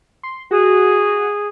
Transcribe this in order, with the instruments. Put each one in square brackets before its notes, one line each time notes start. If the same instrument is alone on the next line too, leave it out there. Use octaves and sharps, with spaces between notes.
[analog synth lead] C6
[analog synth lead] F#4 [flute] G#4